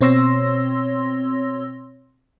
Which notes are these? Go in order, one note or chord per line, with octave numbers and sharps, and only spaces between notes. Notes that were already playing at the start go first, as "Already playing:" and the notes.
B2 C4 C#5 C6 E6 A#6